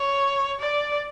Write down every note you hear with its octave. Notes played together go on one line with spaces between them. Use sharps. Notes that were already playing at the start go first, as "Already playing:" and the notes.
Already playing: C#5
D5